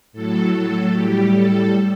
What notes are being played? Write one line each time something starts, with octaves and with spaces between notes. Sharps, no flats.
A2 F#3 A4
A4
A2 G3 G4
A4